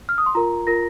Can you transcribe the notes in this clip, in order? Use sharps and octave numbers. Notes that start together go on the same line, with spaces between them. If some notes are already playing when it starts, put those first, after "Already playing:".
F6
D#6
C6
F4 A#4 A#5
F4 A#4 A#6